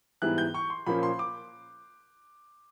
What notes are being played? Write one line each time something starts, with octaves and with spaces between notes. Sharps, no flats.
G#2 E3 G3 B3 E4 F#6
G6
C#6
C6
A#2 F3 A#3 C#4 B5
C6
D6